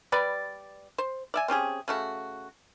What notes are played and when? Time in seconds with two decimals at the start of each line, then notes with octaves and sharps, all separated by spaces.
0.12 G3 B4 D5
0.98 C5
1.34 D5 E5 G#5
1.48 C4 C#4 G4 G#4
1.88 C#3 A3 F#4